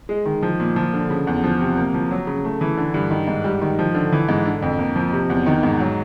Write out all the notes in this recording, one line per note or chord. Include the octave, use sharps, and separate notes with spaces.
G#3
D#3
F3
A#2
F3
D3
C#3
E2
F3
C3
A#3
F3
F#3
C#3
A3
E3
D3
G2
D#3
G#2
G3
D#3
F3
D3
E3
G#2
D3
F2
A#3
F3
C3
E2
D#3
G#2
F#3